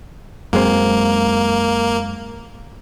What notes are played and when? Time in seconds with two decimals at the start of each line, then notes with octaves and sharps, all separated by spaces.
0.53 F#2 G#3 A#3 C4